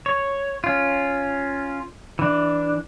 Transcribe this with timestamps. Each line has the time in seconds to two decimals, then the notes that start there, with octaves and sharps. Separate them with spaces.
0.06 C#5
0.64 C#4 F4
2.19 E3 D4